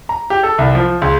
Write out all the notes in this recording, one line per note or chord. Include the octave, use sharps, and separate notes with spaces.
A#5
G4
A4
C2
F3
C#2